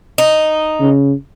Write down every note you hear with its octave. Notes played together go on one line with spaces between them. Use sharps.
D#4
C#3